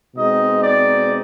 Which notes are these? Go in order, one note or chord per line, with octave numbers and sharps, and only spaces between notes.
B2 G#3 C4 D#4 D#5
D5